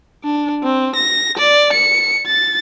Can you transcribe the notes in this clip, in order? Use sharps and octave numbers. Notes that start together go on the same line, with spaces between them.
D4
C4
A#6
D5
C#7
A6